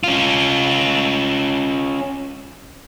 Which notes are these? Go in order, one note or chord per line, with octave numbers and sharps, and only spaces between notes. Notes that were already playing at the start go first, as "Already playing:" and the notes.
C#4 F4